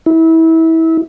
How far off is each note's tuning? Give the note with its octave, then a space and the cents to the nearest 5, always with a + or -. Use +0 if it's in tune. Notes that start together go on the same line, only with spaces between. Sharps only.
E4 -25